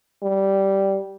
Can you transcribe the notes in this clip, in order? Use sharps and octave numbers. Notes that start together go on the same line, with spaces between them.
G3